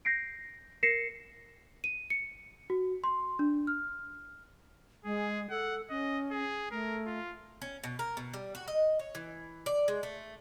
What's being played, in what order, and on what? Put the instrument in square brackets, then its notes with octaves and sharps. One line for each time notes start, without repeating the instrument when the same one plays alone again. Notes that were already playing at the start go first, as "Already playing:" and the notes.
[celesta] G6 A#6 C7 D7
A#4 A#6 C7 C#7 E7
D#7
C#7
F#4
C6
D4
F6
[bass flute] G#3 [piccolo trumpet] G#4
[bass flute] A4 [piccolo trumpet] F#5
[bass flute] C#4 [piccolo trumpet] D#5
[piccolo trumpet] G#4
[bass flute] A3 [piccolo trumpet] A#4
[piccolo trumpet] F4
[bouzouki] C#4
B2
A#4
B2
G3
F#4
D#5
C#5
E3
D5
G#3
A3